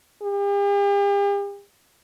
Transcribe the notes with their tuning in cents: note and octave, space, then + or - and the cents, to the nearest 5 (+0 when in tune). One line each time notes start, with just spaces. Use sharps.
G4 +45